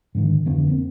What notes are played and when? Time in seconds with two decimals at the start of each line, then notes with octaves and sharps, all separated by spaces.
0.15 G#2 D3 D#3
0.46 F2 D3 E3 B3
0.67 A#3 C4